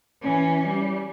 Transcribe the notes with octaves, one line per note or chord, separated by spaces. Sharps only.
E3 C#4
G3